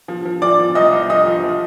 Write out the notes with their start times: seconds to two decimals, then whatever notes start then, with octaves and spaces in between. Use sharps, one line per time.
0.08 F3
0.25 F3
0.42 F3 D5 D6
0.59 F3
0.75 C2 D#5 D#6
0.92 C2
1.10 F3 D#5 D#6
1.26 F3
1.44 F3